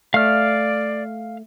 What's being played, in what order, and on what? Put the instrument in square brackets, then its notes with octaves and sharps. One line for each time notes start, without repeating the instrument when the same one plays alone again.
[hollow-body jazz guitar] A3 [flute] D5 [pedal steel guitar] F5 F6